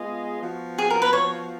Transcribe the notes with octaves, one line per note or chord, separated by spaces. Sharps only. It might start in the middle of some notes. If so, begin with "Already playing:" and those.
Already playing: G#3 B3 F4 G#4 D#5
F3 B3 F#4
G#4
A#4
B4
C#5